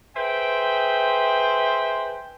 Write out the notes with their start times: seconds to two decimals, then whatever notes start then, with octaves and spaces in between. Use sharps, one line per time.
0.16 G#4 B4 C5 E5 G5